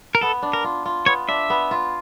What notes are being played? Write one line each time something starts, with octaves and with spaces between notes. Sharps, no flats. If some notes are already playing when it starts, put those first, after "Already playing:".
A#4
B3 A4
D4
A#4
F4
F4
B3 C#5
D4 E5
B3
F4